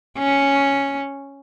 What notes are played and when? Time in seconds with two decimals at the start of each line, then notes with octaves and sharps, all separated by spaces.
0.18 C#4